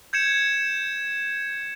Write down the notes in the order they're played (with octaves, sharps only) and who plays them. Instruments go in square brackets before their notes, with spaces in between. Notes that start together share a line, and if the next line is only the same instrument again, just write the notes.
[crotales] G6 G#6 C#7 E7